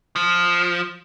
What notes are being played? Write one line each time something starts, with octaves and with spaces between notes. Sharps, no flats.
F3